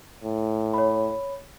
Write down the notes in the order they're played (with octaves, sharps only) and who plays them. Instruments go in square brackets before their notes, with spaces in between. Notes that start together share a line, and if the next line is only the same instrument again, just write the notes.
[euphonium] A2
[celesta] C#5 B5